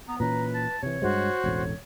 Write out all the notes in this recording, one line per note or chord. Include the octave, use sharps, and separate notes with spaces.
B3 A#5
A#2 E3 C#4 B4 A#5
A5
C3 E3 C#5
G2 G#3 F#4 C5
E1 A1 A2 C#5